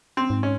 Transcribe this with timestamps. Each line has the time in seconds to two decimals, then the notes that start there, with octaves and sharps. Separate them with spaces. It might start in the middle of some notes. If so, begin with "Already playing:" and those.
0.17 C4
0.30 G#2
0.43 C#4